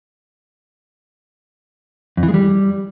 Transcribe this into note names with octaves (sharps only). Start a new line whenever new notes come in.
F2
E3
G#3
G3